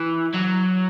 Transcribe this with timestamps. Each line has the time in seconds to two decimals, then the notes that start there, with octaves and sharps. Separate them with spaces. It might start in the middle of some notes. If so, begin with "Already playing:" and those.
Already playing: E3
0.34 F#3